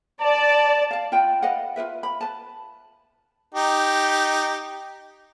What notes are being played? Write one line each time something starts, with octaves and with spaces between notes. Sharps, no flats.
D5 A5
F5 A5
F4 B4 G5
B4 D#5 F5 F#5
F4 A#4 B4 E5
B5
B4 A5
D#4 G4